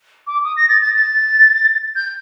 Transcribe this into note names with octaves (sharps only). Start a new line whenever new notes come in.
D6
D#6
A#6
A6
A6
A6
G6